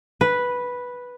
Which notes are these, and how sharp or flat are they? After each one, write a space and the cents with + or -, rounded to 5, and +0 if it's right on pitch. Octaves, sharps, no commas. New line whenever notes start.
B4 -5